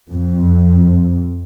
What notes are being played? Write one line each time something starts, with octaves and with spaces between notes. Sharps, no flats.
F2